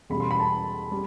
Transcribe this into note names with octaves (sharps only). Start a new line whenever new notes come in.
E2 B2 G3 B5
C6
B5
A5
G3